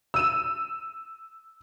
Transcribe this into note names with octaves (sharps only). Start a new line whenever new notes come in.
E6 D#7 E7